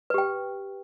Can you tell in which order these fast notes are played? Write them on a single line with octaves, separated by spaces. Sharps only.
B4 G4 G5